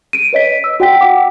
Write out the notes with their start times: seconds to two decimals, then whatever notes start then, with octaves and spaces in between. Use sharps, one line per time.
0.13 D7 D#7
0.33 B4 C#5 D#5 B6
0.64 E6
0.80 F#4 F#5 G5 B6
1.01 F#5 G5 D6